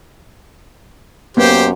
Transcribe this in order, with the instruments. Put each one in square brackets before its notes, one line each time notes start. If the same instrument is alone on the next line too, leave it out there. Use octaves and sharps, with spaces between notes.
[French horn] F#2 [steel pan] A#3 B3 [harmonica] G4 C5